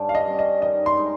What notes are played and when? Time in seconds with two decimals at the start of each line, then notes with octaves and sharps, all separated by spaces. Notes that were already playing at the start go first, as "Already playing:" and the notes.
Already playing: G2 G3 C#4
0.09 F5
0.15 D#5
0.27 G3 C#4
0.39 D#5
0.62 D#3 D#5
0.86 C6
0.97 G#3 D#4